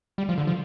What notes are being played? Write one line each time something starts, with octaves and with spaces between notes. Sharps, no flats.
G3
F3
D3
F3